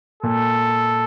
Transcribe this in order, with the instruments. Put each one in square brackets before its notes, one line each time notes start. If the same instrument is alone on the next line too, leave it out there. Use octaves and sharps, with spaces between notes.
[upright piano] A#2 [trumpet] A4